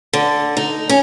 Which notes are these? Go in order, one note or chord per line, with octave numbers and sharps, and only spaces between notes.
D3
D#4
C#4